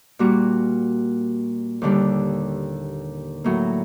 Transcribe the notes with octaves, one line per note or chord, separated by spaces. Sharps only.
A#2 G3 A#3 F#4
D#2 D3 G3
A2 F#3 A#3